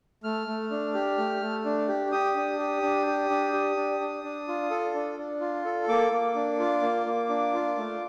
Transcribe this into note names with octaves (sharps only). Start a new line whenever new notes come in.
A3 F6
A3
D4
G4
A3
A3
D4
G4
G4 D#6
D4
G4
D4
G4
D4
G4
D4
D4
D4
F4
A4
D4
D4
F4
A4
A#3 D6
A#3
D4
F4
A#3
A#3
D4
F4
A3